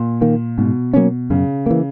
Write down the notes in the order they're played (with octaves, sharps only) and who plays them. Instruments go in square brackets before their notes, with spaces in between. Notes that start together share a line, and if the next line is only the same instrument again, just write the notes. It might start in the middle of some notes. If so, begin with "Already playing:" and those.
Already playing: [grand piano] A#2
[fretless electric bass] D#3 A#3
[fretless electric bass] G#2 [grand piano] B2
[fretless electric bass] F#3 A#3 C#4
[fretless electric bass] F#2 [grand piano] C#3
[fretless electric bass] E3 A#3